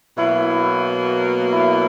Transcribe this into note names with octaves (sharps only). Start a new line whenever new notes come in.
B2 F#3 A#3 E4
E4